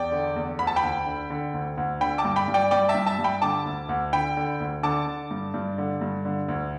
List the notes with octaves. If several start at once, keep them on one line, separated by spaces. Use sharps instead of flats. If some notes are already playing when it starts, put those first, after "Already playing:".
Already playing: E2 D5 G5
D3
E2
D2 B5
A5
G5 B5
D2
D3
D3
D2
D2
D3 G5 B5
A5 D6
G2
G5 B5
G2
D5 G5
G2 D5 G5
E5 A5
G2
E5 A5
G2
G5 B5
D3 A5 D6
D2
D2
D3 G5 B5
D3
D2
D3 A5 D6
D3
G2
G2
D3
G2
D3
D2